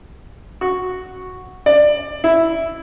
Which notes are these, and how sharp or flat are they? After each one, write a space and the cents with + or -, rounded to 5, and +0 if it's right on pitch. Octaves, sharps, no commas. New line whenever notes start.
F#4 -5
D5 +20
E4 +0